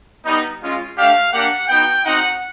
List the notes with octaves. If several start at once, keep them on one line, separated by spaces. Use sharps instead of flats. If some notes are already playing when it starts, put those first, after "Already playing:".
G3 B3 D#4
G#3 C#4 F4
A3 D4 G4 F5
A#3 D4 G4 F#5
B3 D#4 F#4 G5
C4 D#4 F#4 F#5